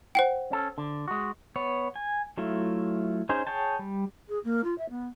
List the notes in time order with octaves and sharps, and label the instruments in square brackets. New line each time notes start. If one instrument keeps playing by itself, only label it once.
[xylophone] C5 F#5 G5
[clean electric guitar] C#4 A4
D3
G#3 F#4
[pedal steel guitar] B3 C#5
G#5
F#3 A3 E4 F4
C#4 D#4 G#4 C5
G#4 C#5 G5 A5
G3
[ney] G#4
A#3
F4
E5
B3